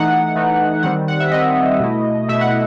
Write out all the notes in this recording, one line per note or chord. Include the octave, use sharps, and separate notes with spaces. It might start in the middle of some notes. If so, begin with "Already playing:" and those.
Already playing: E3 A3 D#4 F#5
E3 A3 D#4
D#3 G3 C4 F#5
F#5
E5
D#3 G3 C4 D#5
B2 A3 E4
B2 A3 E4 E5
F#5